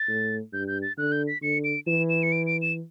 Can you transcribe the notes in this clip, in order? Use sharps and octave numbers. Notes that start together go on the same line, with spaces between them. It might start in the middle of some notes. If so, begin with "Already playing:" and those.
Already playing: A6
A2
G2 G6
G6
A6
D3 F#6
G6
B6
D3 C#7
D7
E3 E7
E7
C#7
D7
D7
E7